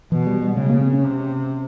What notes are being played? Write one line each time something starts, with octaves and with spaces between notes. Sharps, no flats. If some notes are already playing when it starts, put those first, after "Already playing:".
B2 E3
G3
G3
C#3 G#3
A#3
C4
C#4
C3